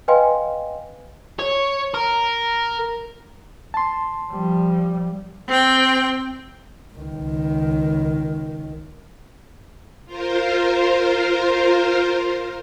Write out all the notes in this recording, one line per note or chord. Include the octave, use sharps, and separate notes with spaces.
B4 D#5 F5 G5 G#5 C6
C#5
A#4
A5 C6
F3 G3
C4 G5
C#2 D#3
F4 A#4 C5